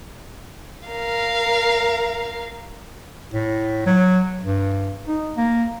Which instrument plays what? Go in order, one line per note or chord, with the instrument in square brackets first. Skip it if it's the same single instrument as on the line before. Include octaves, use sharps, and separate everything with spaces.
[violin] A#4 F5
[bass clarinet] A2
F#3
G2
D#4
A#3